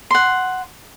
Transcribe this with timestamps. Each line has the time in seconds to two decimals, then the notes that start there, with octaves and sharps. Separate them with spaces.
0.11 F#5 C6